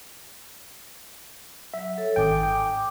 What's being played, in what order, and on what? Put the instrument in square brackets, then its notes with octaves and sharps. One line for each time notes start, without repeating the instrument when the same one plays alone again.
[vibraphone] F#3 [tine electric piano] E5
[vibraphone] A4 C#5
[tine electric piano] G#1 G5 [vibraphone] G#5 D6 D#6
[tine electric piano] G5
[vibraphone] D6